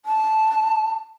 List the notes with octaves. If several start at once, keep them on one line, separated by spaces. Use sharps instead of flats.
A5